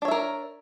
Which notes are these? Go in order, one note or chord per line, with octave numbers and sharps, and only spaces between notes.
D4 A#4 C#5 E5